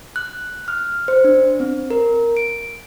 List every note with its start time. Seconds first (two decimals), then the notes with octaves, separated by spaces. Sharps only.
0.16 F#6
0.68 F6
1.08 C5
1.24 D4
1.60 C4
1.91 A#4
2.37 D7